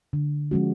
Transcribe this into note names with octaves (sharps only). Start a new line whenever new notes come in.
D3
F3 G#3 C#4 F#4